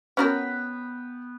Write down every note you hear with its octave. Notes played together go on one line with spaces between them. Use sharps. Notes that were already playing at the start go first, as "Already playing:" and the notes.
B3 C#4 F#4 A#4 B4 G5